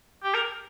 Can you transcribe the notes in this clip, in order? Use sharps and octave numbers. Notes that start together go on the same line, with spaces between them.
G4
A#4